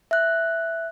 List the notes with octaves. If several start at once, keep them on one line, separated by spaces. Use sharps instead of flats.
E5 F#6